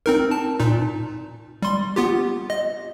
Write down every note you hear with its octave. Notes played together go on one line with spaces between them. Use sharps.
C4 D#4 A#4
A5
A#2 D#4
G3 C6
B3 F4 G4
D#5